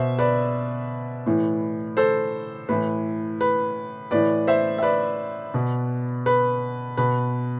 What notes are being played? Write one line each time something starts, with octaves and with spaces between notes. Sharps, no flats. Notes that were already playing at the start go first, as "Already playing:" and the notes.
Already playing: B2 C5 E5
B4 D5
A2 E3
A4 C5
A2 E3 B4
B4
A2 E3 B4 D5
C5 E5
E5
B4 D5
B2
B4
B2 B4